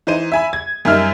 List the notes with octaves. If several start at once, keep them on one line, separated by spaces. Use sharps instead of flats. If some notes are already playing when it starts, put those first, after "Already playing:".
E3 D#4 C5 D#7
E5 G#5 B5
G#6
F#2 G3 D#4 E5 F6